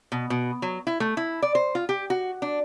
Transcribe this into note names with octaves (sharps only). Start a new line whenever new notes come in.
B2
B2
F#3
E4
A3
E4
D5
C5
F4
G4
F#4
D4